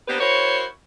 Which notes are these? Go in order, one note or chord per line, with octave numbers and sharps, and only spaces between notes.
A#3 B3 D4 G4 B4 C5
E4 F#4 A#4 C5 C#5